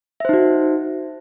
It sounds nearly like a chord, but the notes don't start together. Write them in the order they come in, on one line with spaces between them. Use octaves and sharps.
E5 C5 D#4 F#4